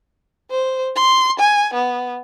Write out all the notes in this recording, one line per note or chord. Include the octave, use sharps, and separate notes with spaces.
C5
C6
G#5
B3